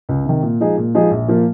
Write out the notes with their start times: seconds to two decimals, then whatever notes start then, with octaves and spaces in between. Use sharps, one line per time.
0.09 C#2
0.26 C3 D#3
0.43 A#2
0.60 F3 G#3 D#4 G#4
0.77 A#2
0.94 F3 G#3 D#4 G#4
1.11 A#1
1.28 A#2 F3 A#3